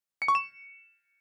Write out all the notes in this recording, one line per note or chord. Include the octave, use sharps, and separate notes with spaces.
C#7
C#6
E7